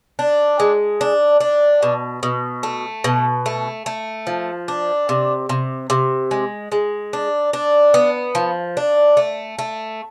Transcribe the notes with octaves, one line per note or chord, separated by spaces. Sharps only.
D4
G#3
D4
D4
B2
B2
A3
B2
A3
A3
F3
D4
C3
C3
C3
G#3
G#3
D4
D4
B3
F3
D4
A3
A3